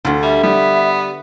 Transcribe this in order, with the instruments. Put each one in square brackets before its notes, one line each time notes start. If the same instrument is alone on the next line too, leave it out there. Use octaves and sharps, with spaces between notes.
[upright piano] D2 [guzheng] D3 F4
[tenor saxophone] G3 [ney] E5
[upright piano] G3 [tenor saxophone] B3